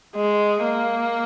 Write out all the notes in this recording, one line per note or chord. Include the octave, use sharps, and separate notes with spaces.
G#3
A#3